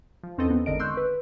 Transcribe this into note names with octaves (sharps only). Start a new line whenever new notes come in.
F3
E2 C4 C#4 A4 D#5
B3
G#1 D3 A#4 D#5 D7
C6 C#6 E6 F#6 G6
B4